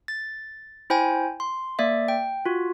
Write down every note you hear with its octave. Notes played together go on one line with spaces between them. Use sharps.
A6
E4 C5 G5 G#5
C6
A#3 D5 E5
G5
F4 F#4